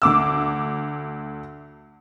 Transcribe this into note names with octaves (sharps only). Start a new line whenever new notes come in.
D2 D6 E6